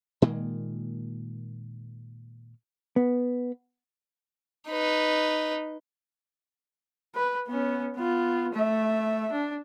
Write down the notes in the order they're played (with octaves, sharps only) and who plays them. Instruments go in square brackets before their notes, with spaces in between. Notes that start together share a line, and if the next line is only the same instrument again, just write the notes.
[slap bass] A#2 D#3 G#3 A#3
[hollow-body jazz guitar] B3
[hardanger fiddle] D#4 B4
[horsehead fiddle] B4
B3 C#4
B3 F4
A3 E5
D4